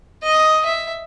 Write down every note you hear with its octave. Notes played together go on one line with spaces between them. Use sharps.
D#5
E5